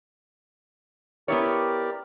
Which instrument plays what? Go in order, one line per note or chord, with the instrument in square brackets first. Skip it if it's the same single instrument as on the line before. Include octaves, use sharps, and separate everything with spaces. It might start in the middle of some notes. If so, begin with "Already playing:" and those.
[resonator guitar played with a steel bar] B3 E4 C#5 [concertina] G4 A#4 D5